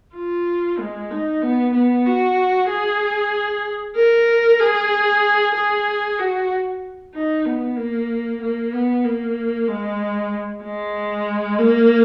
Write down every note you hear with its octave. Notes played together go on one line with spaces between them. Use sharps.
F4
G#3
D#4
B3
B3
F#4
G#4
A#4
G#4
G#4
F#4
D#4
B3
A#3
A#3
B3
A#3
G#3
G#3
A#3